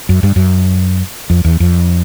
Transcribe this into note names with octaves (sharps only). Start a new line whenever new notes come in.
F#2
G2
F#2
F2
E2
F2